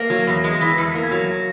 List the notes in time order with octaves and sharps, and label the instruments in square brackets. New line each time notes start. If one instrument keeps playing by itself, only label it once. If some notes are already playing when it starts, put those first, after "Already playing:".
Already playing: [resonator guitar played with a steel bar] A#3 [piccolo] A#6
[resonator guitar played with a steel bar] F#3
E2
G#3
E3
[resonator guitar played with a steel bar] E2 [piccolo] C#7
[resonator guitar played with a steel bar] A#3 [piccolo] B6
[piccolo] G#6
[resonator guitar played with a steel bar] F#3
[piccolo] A#6
A#6